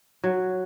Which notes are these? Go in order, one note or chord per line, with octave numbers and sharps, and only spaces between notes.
F#3